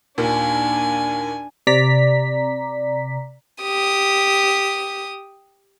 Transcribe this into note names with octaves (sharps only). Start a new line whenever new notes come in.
D#2 A#2 D4 G#5
C3 D5 A#5 B6
G4 D#6